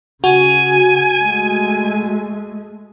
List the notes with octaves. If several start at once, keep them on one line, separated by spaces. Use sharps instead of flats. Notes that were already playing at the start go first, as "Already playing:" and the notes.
C#3 F#4 G#5
G#3 A3